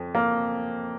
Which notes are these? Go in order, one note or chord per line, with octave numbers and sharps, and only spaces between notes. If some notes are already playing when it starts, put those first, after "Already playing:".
Already playing: F2
A#3